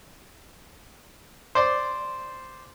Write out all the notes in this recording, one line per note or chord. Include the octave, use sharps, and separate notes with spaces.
C5 D5 C6